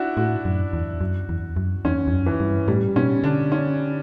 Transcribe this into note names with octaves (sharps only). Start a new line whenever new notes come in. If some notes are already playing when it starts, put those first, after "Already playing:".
Already playing: D4 E4 F#4
A2 F#4
F#2
E2
F#2
E2
F#2
E2 C#4
E2
F#2
E3
G2
A2 G3
B2 C#4
D3 D4
C#4